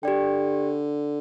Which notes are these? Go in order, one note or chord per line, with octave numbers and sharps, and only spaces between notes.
D3 G4 D5 G5